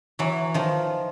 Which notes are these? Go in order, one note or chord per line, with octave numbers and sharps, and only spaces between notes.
E3 F#3
D#3 F3